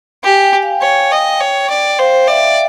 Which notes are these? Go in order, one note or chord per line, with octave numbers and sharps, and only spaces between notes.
G4 G#5
G5
F5
C#5 G5
D#5
C#5
D5
C5 F5
D5 E5